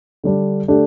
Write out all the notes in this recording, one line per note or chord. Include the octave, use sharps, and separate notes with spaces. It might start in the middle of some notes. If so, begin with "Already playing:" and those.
D3 G3 D4
D3 A3 D4 G4